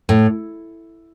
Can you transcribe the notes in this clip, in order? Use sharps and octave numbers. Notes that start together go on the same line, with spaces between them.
A2